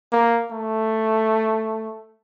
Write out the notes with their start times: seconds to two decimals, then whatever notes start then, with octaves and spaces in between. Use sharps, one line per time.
0.12 A#3
0.52 A3